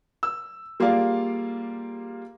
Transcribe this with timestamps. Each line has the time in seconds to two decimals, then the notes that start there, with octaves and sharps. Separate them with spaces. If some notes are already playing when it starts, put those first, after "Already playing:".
0.23 E6
0.80 G3 A#3 F4 G#4 D5 F5